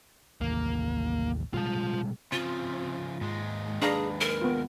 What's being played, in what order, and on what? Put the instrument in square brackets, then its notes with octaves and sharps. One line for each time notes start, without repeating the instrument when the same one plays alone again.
[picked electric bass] A1 D#2 [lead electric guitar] A#3
[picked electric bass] B2 G3 G#3 [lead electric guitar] F4 A5
[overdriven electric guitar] C#3 F3 [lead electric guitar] C4 [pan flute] F4
[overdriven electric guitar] D#2 G#3 [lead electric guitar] G#2
[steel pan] D4 F5 A#5 [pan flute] G#4 [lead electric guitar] B4
[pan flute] A#4
[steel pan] B3 F4